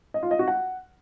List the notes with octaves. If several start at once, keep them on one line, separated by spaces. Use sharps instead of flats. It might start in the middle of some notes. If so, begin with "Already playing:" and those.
D#5
F4
D#5
F#4
F#5